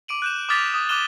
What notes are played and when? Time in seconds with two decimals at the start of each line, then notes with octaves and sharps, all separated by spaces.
0.08 D6 D7 D#7 F#7
0.22 F#6 G6 E7
0.49 D6 D#6 F6 A6 B6 F7
0.74 D#6
0.89 D6 F6 F#6 D#7 E7 G7